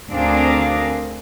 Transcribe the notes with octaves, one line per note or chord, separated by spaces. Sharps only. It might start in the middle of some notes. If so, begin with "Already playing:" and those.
D2 C4 D4 G#4 A#4 F5